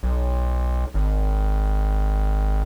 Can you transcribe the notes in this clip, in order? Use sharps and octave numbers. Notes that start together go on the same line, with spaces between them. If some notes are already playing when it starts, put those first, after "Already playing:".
B1
G#1